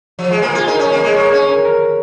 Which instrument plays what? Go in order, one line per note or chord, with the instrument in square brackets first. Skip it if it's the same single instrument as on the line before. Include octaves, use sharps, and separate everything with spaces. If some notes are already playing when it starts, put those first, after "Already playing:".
[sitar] F3
G#3
[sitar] A#3 [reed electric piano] G#4
[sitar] F4
[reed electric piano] G#4
[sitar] D#4 [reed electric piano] A#4
[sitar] C#4 [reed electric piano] C#5
[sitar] A#3
[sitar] G#3 [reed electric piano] D#5
[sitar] A#3 [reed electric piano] C#5
[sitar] C#4 [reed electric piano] C#5
[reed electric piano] A#4
A#4